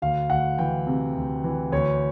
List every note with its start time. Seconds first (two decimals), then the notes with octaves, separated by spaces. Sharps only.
0.02 D2 F5
0.30 D2 F#5
0.58 E3 G5
0.86 C3
1.16 D2
1.44 E3
1.72 D2 C#5